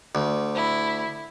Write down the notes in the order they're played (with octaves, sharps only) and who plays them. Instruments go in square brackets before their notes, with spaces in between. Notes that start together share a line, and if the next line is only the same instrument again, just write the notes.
[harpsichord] D2
[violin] E4